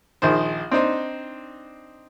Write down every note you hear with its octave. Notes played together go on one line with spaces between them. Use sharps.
A#1 D#3 G#4 C5
C4 D4 D#4 C5